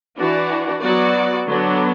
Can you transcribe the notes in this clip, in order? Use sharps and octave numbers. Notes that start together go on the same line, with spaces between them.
E3 D4 F#4 D5
F#3 B3 F#4 D5
D3 F#3 B3 D4